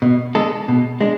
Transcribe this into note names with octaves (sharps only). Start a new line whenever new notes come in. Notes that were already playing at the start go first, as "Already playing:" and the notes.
B2
G#3 D4 A4
B2
G#3 D4